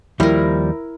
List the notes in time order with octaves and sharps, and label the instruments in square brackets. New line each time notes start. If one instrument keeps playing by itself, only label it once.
[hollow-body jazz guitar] D#2 F3 G3 [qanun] E4 A#4